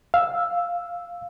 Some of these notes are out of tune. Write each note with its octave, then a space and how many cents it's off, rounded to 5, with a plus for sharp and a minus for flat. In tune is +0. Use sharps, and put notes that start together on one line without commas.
F5 +0 E6 +0